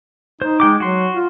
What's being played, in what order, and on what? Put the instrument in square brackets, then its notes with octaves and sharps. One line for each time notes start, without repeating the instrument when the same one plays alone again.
[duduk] D#4 [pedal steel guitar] C5
[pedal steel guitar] G#3 G5 D6
[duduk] F#3 [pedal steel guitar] F#4 C6
[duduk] F4